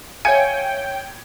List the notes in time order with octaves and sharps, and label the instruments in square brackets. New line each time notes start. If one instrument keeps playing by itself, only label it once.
[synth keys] C#5 E5 F5 [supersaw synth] G5 [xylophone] G#5 [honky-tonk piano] G#6 C#7 D#7